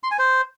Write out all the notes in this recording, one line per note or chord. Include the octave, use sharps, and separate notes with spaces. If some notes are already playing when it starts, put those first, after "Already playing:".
C6
G#5
C5